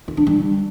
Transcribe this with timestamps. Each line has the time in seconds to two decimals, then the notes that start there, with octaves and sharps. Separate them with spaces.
0.08 F4
0.17 D4
0.27 G3